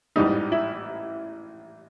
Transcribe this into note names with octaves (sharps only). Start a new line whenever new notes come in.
A1 G#2 E3 G3 D#4
E4